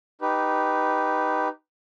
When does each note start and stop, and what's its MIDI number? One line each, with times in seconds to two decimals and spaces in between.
0.21 1.48 63
0.21 1.48 67
0.21 1.48 71